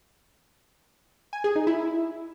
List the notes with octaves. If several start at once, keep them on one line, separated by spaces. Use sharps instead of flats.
G#5
G#4
D#4
E4